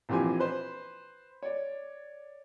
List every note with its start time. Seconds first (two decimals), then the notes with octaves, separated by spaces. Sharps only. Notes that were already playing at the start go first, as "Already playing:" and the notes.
0.09 A#1 E3 F3 C4 G4 G#5
0.40 B4 C5
1.43 C#5 D5